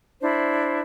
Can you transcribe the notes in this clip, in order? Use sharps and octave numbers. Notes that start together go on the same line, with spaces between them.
D4 E4 C5